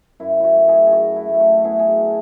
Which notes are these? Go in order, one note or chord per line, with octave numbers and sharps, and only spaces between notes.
F#2 E4
E4 F#4
A3
E4 G#4
G#4
A3 F#4
E4
A3
E4
F#4
B3 E4 G#4
G#4
F#4
D4